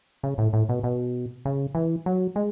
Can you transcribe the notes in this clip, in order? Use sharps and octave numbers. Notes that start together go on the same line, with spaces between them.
C#3
A2
A2
B2
B2
C#3
E3
F#3
G#3